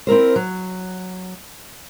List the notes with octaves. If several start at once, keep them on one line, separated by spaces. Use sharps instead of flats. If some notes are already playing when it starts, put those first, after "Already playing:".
C4 E4 A#4 C5
F#3